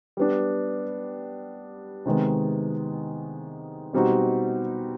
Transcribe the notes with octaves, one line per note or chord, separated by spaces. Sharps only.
G3 B3 D4
C3 D#3 G#3 B3
B2 G3 C4 D#4 F#4